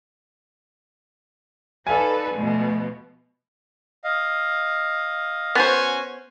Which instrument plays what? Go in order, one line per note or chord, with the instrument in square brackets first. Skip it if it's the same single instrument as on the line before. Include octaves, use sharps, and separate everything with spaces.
[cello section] D#4 A4 B4 [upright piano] D5 F5 G#5
[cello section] B2 F3 A3
[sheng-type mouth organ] D#5 F5
[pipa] B3 C5 [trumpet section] C#4 F#4 G#5